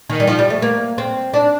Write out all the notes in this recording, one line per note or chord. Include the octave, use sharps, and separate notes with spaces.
D#3
G3
F3
G3
A3
A#3
C4
D4